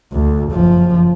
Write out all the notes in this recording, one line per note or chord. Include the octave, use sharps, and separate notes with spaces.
D2
F#1 F3